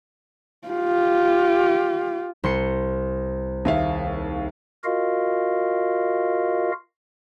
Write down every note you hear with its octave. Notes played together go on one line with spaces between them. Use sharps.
F4 G4
C2 C6 C#7
D#2 G#4 E5 F5
F4 F#4 A#4 D#5 F5